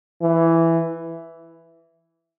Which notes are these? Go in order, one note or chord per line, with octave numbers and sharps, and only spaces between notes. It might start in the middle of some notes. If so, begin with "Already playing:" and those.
E3